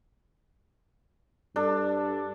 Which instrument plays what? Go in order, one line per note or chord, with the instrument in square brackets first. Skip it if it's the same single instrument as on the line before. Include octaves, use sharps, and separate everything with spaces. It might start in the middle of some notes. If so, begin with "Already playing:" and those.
[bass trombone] G2 [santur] D4 A4